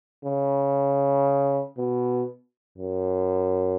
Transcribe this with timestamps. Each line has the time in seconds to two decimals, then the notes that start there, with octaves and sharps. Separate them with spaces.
0.25 C#3
1.78 B2
2.78 F#2